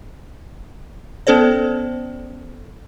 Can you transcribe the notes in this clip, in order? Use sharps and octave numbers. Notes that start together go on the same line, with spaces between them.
B3 C#4 A4 C5 D5